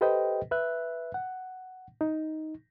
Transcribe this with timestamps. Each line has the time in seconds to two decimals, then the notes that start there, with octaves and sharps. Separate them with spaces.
0.01 G4 A4 B4 C5 D#5 G5
0.51 B4 E5 F#6
1.14 F#5
2.01 D#4